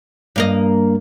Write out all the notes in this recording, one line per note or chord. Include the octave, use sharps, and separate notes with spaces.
G2 A#3 D#5